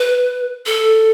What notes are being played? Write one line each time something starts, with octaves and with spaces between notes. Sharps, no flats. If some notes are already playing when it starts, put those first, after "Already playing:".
Already playing: B4
A4